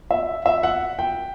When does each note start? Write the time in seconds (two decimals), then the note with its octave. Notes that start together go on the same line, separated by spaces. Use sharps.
0.11 E5
0.46 E5
0.63 F#5
0.99 G5